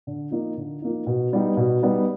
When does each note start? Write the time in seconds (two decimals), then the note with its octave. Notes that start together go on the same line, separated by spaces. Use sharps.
0.07 D3
0.31 F3 A#3 D#4
0.57 D3
0.82 F3 A#3 D#4
1.07 B2
1.33 G3 B3 D#4
1.57 B2
1.82 G3 B3 D#4